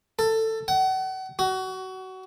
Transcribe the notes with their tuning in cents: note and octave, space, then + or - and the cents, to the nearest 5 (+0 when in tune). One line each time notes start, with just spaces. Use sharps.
A4 +20
F#5 +35
F#4 +25